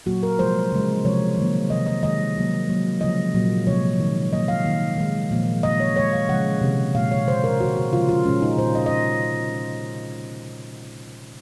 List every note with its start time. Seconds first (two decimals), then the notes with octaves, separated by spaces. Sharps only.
0.06 A#2 F#3 A#3 F#4
0.23 A#4
0.39 C3 F3 G#3 C5
0.72 C#3 G#3
1.05 C3 F3 G#3 C#5
1.37 D#3 F#3 A#3
1.70 C3 D#3 G#3 D#5
1.86 D#5
2.03 D#3 G#3 D#5
2.36 C3 F#3 A#3
2.68 D#3 F#3 A#3
3.01 C#3 F3 G#3 D#5
3.34 A#2 F#3 A#3
3.67 C3 F3 G#3 C#5
4.00 D#3 G#3
4.32 A#2 F#3 A#3 D#5
4.48 F5
4.65 D#3 A#3
4.98 D#3 G#3
5.31 A#2 F3 A#3
5.63 C#3 G#3 D#5
5.80 C#5
5.96 C#3 G#3 C#5
6.13 F5
6.29 C#3 F3 G#3 F#5
6.61 C3 D#3 A#3
6.95 A#2 G#3 F5
7.11 C#5
7.27 C#3 G#3 C5
7.44 A#4
7.61 D#3 G#3 F#4
7.77 F#4
7.93 C#3 F3 G#3 F4
8.09 F4
8.26 A#2 G#3 C#4
8.42 D#4
8.58 A#2 G#3 C5
8.75 D#5
8.86 D#5